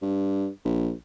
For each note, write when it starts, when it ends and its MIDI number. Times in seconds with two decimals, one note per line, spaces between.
0.02 0.48 43
0.65 0.92 34